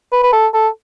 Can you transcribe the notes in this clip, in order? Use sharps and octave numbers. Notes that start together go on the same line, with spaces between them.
B4
B4
A4
A4